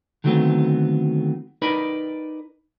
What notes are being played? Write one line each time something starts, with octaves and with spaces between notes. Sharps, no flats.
D3 D#3 F#3 A3 B3 C4
D#4 A#4 B4 D5 B5